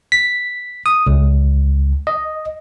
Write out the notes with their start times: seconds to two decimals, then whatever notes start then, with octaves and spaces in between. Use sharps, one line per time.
0.12 B6
0.86 D#6
1.07 C#2
2.07 D#5